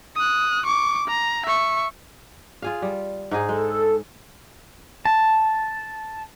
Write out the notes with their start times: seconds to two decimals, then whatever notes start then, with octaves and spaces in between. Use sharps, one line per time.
0.15 D#6 F#6
0.66 C#6 D6
1.07 A#5
1.46 E5 C#6
2.62 F4 G#4 F5
2.82 G3
3.31 G#2 D#4 G#4
3.49 G#3 A4
5.05 A5